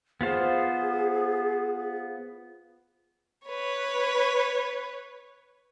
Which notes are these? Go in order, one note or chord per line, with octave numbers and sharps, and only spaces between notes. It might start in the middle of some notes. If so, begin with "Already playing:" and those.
B3 F4 G#4 C5
B4 C#5